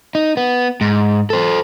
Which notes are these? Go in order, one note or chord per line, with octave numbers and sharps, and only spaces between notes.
D#4
B3
G#2
A4 C5